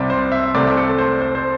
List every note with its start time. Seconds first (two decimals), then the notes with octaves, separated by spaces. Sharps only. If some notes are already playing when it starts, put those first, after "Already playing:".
Already playing: C2 C3 G3 C4 D5 E5
0.10 C5
0.32 E5
0.55 C2 C3 A3 C4 D5
0.77 A4
0.89 A4
0.98 C5
1.22 C5
1.35 C5